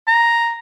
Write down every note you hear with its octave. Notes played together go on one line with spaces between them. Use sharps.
A#5